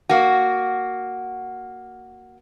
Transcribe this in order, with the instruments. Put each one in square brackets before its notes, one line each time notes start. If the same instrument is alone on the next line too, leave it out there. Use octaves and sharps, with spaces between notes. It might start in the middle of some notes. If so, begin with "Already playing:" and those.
[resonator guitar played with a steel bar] A#3 F#4